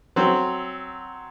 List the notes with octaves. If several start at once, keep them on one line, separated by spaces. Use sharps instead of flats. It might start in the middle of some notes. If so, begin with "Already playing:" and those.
F#3 C4